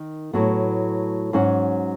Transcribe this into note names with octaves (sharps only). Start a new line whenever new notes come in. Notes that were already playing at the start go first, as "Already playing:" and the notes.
Already playing: D#3
A2 F#3 B3
G#2 F#3 C#4 F#4